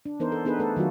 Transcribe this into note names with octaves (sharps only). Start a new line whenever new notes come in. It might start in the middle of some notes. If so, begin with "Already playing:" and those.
D4
E3 B3 D#4 A#4 C5
A4
B3 D4 D#4 G#4 A4 B4
A3 A4 B4
D#3 F#3 F4 F#4